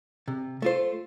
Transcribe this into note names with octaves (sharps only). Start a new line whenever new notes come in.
C3
A3 F4 C5